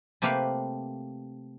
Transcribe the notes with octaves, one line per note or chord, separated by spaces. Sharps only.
C3 A3 A#3 G4 B4 F5